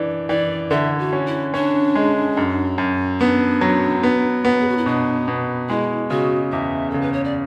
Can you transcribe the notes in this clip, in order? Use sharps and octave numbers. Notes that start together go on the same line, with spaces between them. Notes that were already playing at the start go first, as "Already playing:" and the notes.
Already playing: E3 D4
E3 D5
D3 E5
F#4
C#4
E4
C#4 D4
G#3
F#2
F#2
B3 D4
F#3
B3
B3
G#4
F#4
E4
B2 D4
B2
G#3 E4
C#3 F#4
E2 E5
C#3 A4
B4
C#5
D5